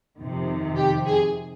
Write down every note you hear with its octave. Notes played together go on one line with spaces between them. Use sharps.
F2 C3 D#3
G4
G#4